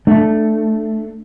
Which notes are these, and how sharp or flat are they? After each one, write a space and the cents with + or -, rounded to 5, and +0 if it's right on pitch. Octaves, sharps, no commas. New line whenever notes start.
A3 +0 D4 +25